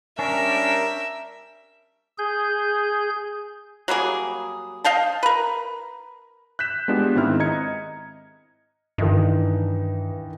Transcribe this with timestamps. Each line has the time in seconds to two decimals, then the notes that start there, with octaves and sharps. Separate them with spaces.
0.19 G3 C#4 D4 A#4 E5
2.18 G#4 G6
3.88 F#3 G3 A#3 G#4
4.84 D#5 F5 G5 A5
5.23 A#4 B4
6.59 F#6 G6 B6 E7
6.88 G#3 B3 D4 F4 G4
7.15 G#2 D#3 C4 E4 F6
7.40 D#5 A#5 G#6 C#7
8.98 G2 D#3 E3 D#4